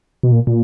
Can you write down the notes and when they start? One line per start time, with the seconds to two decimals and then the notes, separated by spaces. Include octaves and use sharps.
0.23 B2
0.32 A#2
0.47 A#2